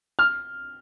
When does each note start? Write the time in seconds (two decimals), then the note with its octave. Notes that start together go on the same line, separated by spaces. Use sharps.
0.19 F6